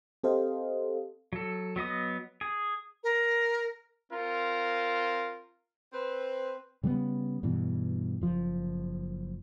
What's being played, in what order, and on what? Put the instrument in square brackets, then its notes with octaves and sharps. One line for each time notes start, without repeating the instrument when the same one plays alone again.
[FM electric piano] C4 G4 A4 C5 D#5 F5
[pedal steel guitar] F#3 A4
F#3 B3 D#5 D#6
G#4
[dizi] A#4
[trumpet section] C4 F4 A#4
[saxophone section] C4 B4
[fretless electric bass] C#3 G3 G#3 B3
G2 B2 E3
F#1 F3